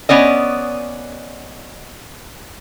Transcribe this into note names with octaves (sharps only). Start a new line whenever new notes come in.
B3 C#4 D5 D#5